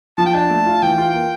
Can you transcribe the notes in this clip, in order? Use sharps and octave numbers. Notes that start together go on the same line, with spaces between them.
F3 A5
G5
D4 A5
A3
F4
E3 G5
F4
A#3